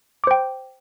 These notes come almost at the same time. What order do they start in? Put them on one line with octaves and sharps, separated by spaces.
D6 C5 G5